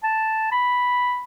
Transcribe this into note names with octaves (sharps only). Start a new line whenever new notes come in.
A5
B5